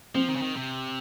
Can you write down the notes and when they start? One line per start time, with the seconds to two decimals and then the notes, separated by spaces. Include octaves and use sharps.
0.15 F3 C4
0.28 D#3
0.36 C#3
0.42 D#3
0.56 C3